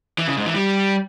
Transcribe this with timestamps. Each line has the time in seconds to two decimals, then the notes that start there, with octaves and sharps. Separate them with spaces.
0.18 E3
0.28 C#3
0.37 G#2
0.46 E3
0.56 G3